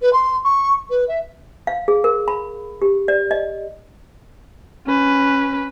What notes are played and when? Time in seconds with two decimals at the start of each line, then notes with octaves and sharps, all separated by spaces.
0.01 B4
0.13 C6
0.44 C#6
0.90 B4
1.08 E5
1.67 F5
1.88 G#4
2.04 A#4
2.28 B5
2.82 G4
3.08 D5
3.31 D#5
4.86 C#4 B4